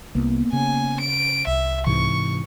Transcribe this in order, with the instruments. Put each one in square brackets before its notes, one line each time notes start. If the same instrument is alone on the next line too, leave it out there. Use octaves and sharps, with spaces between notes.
[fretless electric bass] C2 [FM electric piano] A#3 B3
[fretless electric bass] C#3 [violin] G#5
[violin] D7
[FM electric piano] C2 [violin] E5
[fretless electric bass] G#2 C3 E3 [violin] C#6